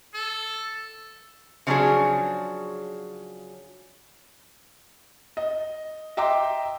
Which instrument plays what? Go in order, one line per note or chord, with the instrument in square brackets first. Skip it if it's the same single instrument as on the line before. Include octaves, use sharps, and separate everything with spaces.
[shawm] A4
[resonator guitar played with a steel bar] C#3 F3 F#3 C#4 D4 G#4
[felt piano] D#5
D#5 E5 G5 A#5 C6 D6